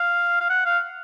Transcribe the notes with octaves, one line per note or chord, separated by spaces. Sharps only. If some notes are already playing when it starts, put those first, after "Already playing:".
Already playing: F5
F5
F#5
F5